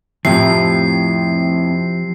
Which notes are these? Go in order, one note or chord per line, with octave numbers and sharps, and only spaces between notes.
F2 A2 C3 F3 C7